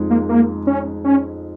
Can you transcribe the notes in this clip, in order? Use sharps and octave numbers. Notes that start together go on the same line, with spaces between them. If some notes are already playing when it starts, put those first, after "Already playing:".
Already playing: F2 G#3 D#4
A#3
A#3
C#4
C#4